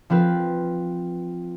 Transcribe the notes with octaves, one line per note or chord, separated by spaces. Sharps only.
F3 C4 F4 B4